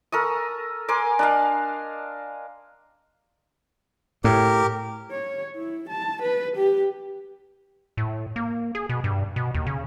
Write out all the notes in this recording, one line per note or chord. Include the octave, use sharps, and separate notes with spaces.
A4 A#4 C#6 D#6
A#4 G#5 C6 D6
D4 D#5 F5
A2 G4 A#4
C#5
E4
A5
B4
G4
A2
A#3
G#4
B2
G2
B2
D#2
C#3